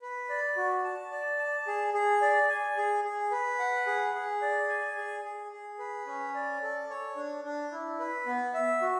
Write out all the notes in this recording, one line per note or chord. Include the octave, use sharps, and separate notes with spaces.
B4
D5
F#4
A5
D5
A5
G#4
G#4
D5
G#5
G#4
G#4
B4
F#5
G#4
G#4
D5
G#5
G#4
G#4
G#4
B4
C#4
D5
A4
C#5
D4
D4
E4
B4
B3
E5
F#4